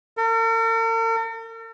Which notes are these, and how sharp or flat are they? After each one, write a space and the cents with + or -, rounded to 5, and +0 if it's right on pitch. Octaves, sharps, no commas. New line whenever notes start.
A#4 -45